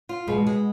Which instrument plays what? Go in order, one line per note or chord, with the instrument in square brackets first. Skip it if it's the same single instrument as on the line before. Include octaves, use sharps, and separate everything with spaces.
[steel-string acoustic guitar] F4
[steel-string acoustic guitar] B2 [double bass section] G#3
[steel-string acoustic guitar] G#3